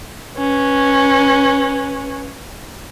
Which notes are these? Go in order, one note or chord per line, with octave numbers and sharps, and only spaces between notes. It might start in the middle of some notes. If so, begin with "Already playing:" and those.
C#4 B4